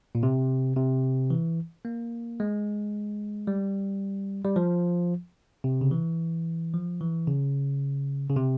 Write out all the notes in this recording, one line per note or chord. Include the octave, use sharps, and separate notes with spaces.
A#2
C3
C3
E3
A#3
G#3
G3
G3
F3
C3
C#3
E3
F3
E3
C#3
C#3
C3